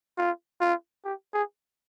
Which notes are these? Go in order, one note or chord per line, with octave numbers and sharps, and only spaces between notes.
F4
F4
G4
G#4